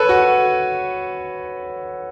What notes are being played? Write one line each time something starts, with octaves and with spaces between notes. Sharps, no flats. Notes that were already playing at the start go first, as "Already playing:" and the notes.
Already playing: A4 B4 C#5
F#4